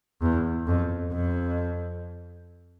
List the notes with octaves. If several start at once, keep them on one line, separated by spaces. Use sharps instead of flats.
E2
F2
F2